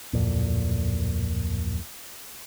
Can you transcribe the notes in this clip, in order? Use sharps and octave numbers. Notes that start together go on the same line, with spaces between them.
D1 G1 F2 A#2